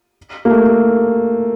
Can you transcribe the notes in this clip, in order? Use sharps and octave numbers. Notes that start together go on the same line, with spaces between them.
A#3
A3